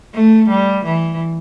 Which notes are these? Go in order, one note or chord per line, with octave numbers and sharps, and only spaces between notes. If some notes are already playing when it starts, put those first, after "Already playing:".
A3
G3
E3